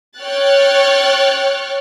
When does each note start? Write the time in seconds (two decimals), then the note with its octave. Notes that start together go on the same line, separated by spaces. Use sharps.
0.20 C#5 G5 C#6 F6 F#6 A6